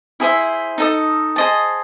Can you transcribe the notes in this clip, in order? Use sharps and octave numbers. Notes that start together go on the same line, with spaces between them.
E4 G#4 C5 E5
D#4 A4 D#5
G#4 C5 D#5 A5